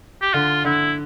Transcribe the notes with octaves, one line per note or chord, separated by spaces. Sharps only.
G4
D3 F4
D3 E4